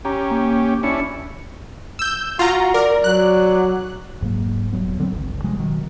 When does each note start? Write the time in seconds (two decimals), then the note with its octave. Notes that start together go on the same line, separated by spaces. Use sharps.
0.05 C#4 G4 A#5
0.31 A#3
0.83 C#4 D4 E4 C#7
1.99 E6 G6
2.39 F4 F#4 A#5
2.74 A#4 D5
3.04 F#3 F#6
4.21 E1 G#2 F#3 A#3
4.73 D#1 F#3 B3
5.00 D3 F#3 C4
5.12 G1 C#2
5.44 C3 F3 G3 G#3
5.59 B2 D#3 F#3